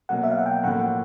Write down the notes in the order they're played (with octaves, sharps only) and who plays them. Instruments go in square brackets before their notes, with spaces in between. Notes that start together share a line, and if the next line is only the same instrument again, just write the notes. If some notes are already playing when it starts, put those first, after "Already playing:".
[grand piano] B2 F#3 A#3 [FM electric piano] F#5
[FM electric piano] E5
F5
F#5
G5
[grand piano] A2 F3 A#3 [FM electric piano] F#5